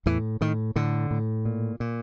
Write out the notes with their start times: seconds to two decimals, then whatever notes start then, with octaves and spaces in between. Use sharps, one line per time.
0.06 E2 A2 E3
0.41 A2 D#3
0.76 A2 D3
1.11 A2
1.45 A#2
1.80 A#2